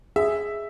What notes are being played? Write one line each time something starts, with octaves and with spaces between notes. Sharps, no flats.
G#4 E5